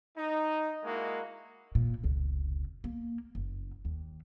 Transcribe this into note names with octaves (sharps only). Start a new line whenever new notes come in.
D#4
G#3 A#3 E4 F#4
A#2
F1 C#2
A#3
F#1
D#2